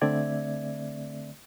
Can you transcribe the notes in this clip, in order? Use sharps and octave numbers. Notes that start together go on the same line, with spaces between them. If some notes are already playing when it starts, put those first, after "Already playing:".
D3 A3 C4 D5 E5 G#6